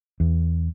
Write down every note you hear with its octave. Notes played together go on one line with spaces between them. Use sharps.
E2